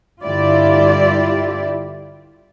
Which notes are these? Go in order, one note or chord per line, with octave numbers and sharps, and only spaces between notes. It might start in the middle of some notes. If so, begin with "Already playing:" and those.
G2 D3 E4 F4 G4 D5